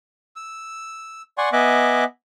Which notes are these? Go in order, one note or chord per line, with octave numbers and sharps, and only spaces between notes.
E6
D5 F#5 G#5 C6 C#6
B3 D#5 E5 G#5 D6 F#6